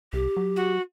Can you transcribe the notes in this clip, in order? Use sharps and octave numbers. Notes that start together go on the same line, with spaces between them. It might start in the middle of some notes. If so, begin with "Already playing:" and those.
C2 G4
F#3
F#4